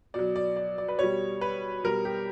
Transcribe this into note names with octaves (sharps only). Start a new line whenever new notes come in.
B2 F#3 D5
D5
D5
D5
B4
B2 G3 C#5
B4
B2 G3 A#4
G4